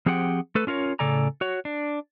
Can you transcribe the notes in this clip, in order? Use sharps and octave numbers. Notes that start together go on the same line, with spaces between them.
F3 C4 G4 G#4 F#5 G5
A3 A4 B4
C#4 F4 A#4 C#5
A2 C#3 A4 D5 G#5 A#5
F#4 C#5
D4